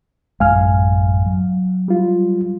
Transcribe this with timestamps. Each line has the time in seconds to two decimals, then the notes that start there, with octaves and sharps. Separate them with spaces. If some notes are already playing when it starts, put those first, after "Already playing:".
0.40 A1 F#2 G#3 F5 G#5 F6
1.26 F#3
1.88 G3 F4